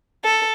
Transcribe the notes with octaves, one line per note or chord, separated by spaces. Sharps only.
A4